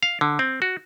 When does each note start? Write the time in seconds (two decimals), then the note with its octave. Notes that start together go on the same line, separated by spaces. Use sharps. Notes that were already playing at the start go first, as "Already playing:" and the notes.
0.03 F5
0.21 D3
0.39 C4
0.62 F#4